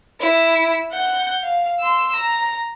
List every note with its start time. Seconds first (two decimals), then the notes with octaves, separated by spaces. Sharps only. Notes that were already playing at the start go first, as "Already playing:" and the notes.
0.20 E4
0.92 F#5 G6
1.43 F5
1.80 C6 E6
2.16 A#5